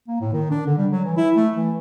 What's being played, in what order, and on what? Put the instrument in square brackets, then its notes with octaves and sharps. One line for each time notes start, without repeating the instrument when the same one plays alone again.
[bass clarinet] A#3
A2
D#3
D4
D3
G3
F#3
E3
E4
A3
E3